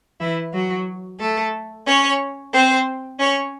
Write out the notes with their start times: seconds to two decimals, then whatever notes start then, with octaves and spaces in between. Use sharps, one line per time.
0.20 E3 E4
0.54 F#3 F#4
1.20 A3 A4
1.86 C#4 C#5
2.53 C4 C5
3.19 C#4 C#5